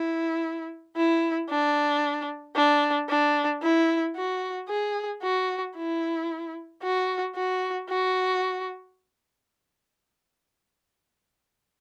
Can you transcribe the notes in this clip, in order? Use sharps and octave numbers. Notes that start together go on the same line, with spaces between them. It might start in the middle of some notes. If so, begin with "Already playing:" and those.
Already playing: E4
E4
D4
D4
D4
E4
F#4
G#4
F#4
E4
F#4
F#4
F#4